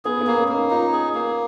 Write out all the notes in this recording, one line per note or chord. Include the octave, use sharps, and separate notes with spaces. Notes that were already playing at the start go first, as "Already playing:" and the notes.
B3 G#4
B3
A#3
C#4
A#3
D#4
D#4 F4
G#4
A#3